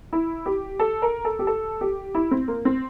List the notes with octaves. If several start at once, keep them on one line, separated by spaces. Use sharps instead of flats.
E4
G4
A4
A#4
A4
G4
A4
G4
E4
C4
A#3
C4